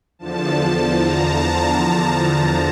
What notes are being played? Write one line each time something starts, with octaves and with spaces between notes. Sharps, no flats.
E2 D3 F3 A5
A5
A#5
A5
A#5